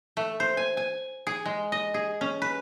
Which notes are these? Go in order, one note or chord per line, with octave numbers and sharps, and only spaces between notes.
A3
C5
G#5
G#5
G#4
G#3
D#5
G#4
C#4
B4